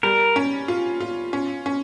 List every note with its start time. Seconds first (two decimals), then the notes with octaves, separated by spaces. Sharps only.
0.03 G3 A#4
0.36 C#4
0.68 F4
1.00 F4
1.33 C#4
1.66 C#4